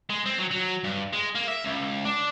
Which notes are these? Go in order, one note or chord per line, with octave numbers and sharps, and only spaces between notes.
G#3
C4
F#3
F#3
G2
G#3
A#3
E5
C#2
D4